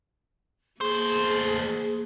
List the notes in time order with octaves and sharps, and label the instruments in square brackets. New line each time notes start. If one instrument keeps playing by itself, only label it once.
[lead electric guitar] A3 C5 [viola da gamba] A#3 [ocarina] G#4